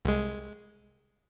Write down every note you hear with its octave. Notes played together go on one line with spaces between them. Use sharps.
C2 G#3